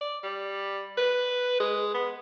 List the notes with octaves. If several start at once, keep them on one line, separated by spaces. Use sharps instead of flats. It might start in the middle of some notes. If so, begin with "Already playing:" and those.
D5
G3
B4
G#3
B3